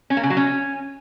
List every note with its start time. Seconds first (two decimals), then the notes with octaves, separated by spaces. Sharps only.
0.10 C#4
0.17 A#3
0.23 C#3
0.30 F#3
0.37 C#4